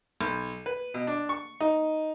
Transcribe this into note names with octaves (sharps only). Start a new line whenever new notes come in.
B1
B4
B2
D4
C#6
D#4